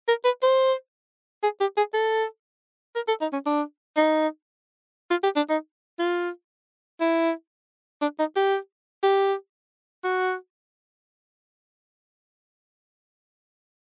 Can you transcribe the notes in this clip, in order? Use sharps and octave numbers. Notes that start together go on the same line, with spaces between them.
A#4
B4
C5
G#4
G4
G#4
A4
A#4
A4
D#4
C#4
D4
D#4
F4
G4
D4
D#4
F4
E4
D4
D#4
G4
G4
F#4